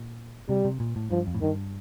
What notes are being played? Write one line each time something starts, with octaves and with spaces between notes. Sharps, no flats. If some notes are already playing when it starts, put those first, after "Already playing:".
Already playing: A#2
C3 G3
C3
A#2
A2
G2 F3
F2
A2
G2 D#3